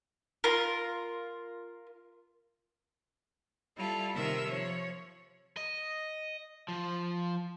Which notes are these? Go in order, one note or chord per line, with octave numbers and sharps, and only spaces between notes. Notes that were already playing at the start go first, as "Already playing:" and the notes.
F4 A#4
G3 E4 F4 A4
C3 D#3 A#4 E5 C6 E6
F3 C#5
D#5
F3